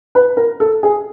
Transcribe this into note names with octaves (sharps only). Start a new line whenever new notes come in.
B4
A#4
A4
G#4